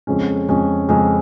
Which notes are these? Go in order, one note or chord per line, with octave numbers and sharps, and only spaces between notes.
F2 C#3 G#3 C#4
F2 C#3 G#3 C#4
F2 C#3 G#3 C#4